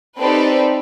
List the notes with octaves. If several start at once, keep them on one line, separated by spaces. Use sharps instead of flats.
C4 D#4 G4 A4 B4 D5